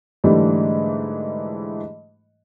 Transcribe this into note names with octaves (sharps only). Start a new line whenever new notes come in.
G#2 D3 E3 G3 A3